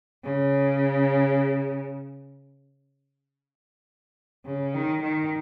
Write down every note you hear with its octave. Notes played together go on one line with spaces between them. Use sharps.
C#3
C#3
D#3
D#3